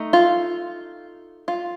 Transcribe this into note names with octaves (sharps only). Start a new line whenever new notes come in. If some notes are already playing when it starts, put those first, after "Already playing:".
Already playing: A3 D#4
F4
F4